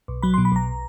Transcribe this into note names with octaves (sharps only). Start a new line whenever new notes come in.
B1
F#3 B5
C6
B2
B5
B1 A#5